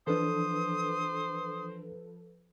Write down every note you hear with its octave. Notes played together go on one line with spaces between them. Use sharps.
E3 F3 D4 A4 B4 C5 D#6